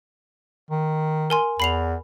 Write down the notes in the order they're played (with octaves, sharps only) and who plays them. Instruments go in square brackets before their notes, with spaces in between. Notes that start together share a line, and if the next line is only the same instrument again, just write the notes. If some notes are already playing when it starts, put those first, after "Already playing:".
[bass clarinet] D#3
[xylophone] A#4 G#5 C6
[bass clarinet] E2 [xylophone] B5 C7 F7